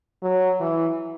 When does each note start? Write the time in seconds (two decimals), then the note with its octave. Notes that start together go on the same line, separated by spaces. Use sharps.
0.23 F#3
0.60 E3